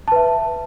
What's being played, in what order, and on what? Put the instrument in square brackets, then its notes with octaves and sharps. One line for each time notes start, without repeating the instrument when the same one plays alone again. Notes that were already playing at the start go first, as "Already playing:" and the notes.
[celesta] A5
B4
E5